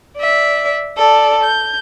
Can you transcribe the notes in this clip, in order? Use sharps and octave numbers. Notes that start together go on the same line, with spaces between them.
D5 E5
A4 D5
G6